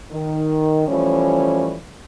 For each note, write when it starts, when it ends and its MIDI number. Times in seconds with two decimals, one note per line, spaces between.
0.11 0.86 51
0.88 1.75 52
0.88 1.75 53
0.88 1.75 55
0.88 1.75 57
0.88 1.75 61